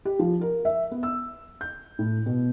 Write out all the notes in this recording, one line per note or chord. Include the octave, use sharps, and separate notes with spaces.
G4
F3
A#4
E5
B3
E6
G6
A2
B2